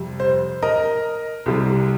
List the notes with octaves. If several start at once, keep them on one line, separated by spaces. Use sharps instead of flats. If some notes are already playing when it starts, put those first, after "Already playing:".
Already playing: F2 C3 G3
C5
A#4 D#5
C2 C3 G3